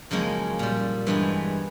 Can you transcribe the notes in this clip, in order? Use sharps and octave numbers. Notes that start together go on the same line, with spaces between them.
F#2 C#3 F3 G#3 A#3
A#2 G3
G2 E3 G#3 B3